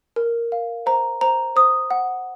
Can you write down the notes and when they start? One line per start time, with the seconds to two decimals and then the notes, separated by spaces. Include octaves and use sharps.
0.16 A#4
0.52 F5
0.86 C5 A#5
1.21 C5 A#5
1.56 C5 D#6
1.91 F#5